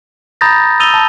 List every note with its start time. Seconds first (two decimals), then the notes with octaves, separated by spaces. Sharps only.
0.41 A#5 B5 D#6 G6 A6 A#6
0.80 D#6 E6 A6 D#7 F7 G7
0.94 A5